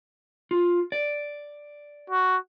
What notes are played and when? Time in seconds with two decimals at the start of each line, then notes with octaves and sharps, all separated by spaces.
0.51 F4
0.92 D5
2.10 F#4